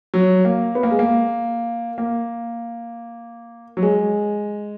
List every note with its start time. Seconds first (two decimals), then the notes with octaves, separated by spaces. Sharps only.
0.14 F#3
0.45 A#3
0.75 B3
0.83 A#3
0.91 G#3
0.99 A#3
1.98 A#3
3.77 F#3
3.83 G#3